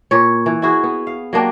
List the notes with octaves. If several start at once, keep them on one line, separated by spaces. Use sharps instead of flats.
A#2 C#5
E3
E4 F#4 G#4
B3
F5
F#3 A#3 D4 G4